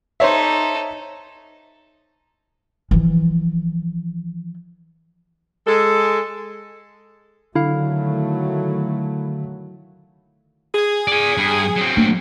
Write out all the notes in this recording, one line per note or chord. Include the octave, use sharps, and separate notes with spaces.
D#4 A4 C5 C#5 E5
E3 F3
G#3 A4
D3 D#3 F#3 A3 E4 F5
G#4
D5 G#5
G2
F#3 C4
A3 A#3 D4